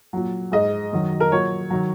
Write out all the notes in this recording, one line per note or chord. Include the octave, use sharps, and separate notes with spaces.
A#2 F#3
G#2 G#3 D#5
F#2 D#3 F#3
A#4
A#2 F#3 C#5
D#3 F#3